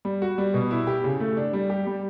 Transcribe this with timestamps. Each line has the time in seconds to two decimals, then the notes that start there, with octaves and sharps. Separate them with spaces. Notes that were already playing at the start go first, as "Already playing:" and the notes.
0.05 G3
0.22 F#4
0.38 G3
0.54 B2
0.71 E4
0.87 G4
1.04 C#3
1.20 A3
1.37 D4
1.53 G3
1.70 G4
1.87 G3